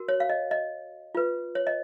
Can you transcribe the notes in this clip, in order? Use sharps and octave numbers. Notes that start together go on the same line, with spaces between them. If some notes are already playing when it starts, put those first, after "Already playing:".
Already playing: F#4 A#4
C#5
F5
D#5
D#5
F4 B4
C#5
D#5